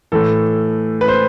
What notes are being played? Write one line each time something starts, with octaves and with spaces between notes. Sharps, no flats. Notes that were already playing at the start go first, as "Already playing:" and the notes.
A2 E3 A4
B4
C5